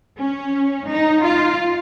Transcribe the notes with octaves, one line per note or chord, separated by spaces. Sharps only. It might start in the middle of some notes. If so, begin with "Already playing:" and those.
C#4
D#4
F4